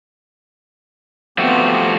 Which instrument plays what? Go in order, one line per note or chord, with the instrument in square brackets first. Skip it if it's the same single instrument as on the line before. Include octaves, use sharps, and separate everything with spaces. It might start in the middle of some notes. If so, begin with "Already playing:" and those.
[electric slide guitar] F3 A3 F#4 [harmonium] B3 C4 G4